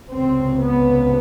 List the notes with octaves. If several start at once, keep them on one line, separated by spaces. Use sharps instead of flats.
C#2 C3 C4
B3